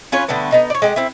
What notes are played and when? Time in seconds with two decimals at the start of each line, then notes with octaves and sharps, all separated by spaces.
0.12 C#4 F4 B4 C#5
0.28 D3 G3 A3 B3
0.52 B3 D#4
0.70 C#5 D5
0.82 G#3 G4 F#5
0.96 C4 E4